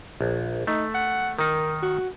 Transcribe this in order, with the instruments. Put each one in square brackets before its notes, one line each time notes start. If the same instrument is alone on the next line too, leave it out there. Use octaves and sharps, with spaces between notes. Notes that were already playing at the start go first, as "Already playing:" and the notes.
[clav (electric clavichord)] A#1
[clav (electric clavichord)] A3 [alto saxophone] D#4
[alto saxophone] F#5
[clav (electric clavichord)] D#3 D#4 [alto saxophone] A#4
[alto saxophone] F#4